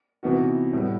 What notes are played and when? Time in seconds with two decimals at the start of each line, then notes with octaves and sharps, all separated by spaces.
0.23 C3 E3 B3 D#4 F#4
0.73 A2 G3 B3